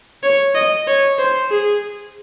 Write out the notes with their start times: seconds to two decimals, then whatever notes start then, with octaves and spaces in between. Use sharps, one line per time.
0.23 C#5
0.55 D#5
0.88 C#5
1.19 C5
1.50 G#4